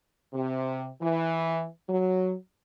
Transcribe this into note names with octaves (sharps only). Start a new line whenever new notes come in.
C3
E3
F#3